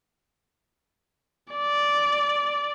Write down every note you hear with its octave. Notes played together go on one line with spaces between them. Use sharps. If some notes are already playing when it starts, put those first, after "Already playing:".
D5